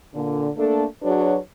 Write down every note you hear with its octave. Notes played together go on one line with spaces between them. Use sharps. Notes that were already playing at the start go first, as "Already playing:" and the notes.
A#2 D3
A3 A#3 D4 A4
F#3 D4 F#4 G#4 B4 C#5